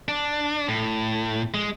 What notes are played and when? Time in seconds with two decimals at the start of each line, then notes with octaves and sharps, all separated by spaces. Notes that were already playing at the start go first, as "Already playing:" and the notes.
0.08 D4
0.69 A2
1.54 G#3